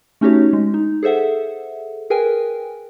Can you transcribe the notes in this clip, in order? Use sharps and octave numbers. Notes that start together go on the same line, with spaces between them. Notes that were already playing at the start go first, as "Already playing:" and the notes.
A3 C#4 D#4 F#4 G4 C#5
G#3
D#4
G#4 A4 C5 E5 F#5
G#4 A#4 B4 G5 G#5